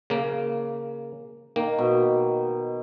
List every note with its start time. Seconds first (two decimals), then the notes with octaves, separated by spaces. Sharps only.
0.10 C#3 A#3
1.56 D#3 A#3
1.78 B2